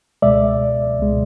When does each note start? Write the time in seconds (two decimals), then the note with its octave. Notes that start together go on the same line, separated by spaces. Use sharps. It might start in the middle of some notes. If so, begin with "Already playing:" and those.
0.22 C#2 B2 G#3 D5 E5
0.99 C#2 B2 G#3